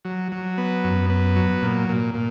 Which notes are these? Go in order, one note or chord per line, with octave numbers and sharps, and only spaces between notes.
F#3
F#3
B3
F#2
B3
F#3
A#2
A#2
A#2